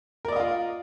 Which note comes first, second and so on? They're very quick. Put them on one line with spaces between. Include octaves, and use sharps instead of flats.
A#4 D5 D#5 F5 F4